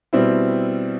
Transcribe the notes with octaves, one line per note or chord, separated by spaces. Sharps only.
B2 G3 C4 E4